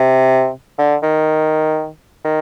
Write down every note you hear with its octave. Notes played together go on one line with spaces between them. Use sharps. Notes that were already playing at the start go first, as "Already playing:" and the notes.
Already playing: C3
D3
D#3
D#3